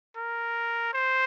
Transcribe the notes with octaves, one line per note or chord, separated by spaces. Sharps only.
A#4
C5